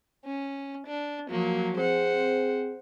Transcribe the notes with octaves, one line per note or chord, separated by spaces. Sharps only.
C#4
D4
F3 F#3 A#3
C4 G#4 C5 F#5